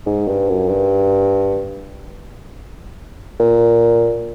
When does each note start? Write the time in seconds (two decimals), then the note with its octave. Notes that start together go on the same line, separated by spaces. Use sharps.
0.06 G#2
0.28 G2
0.49 F#2
0.69 G2
3.40 A#2